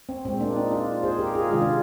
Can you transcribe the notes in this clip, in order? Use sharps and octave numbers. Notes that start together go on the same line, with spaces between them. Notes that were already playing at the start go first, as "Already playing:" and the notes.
C4
A#2 G#3 C4
A#3 D4
C4 D#4
D4 F4
G#4 C5
G4 A#4
F4 G#4
C3 D#3 G#3 F4 G#4
D4 F4